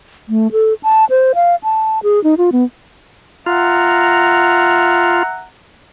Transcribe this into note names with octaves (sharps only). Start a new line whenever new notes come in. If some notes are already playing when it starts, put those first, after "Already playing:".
A3
A4
A5
C5
F5
A5
G#4
D#4
F4
B3
F4 E5 F#5 A#5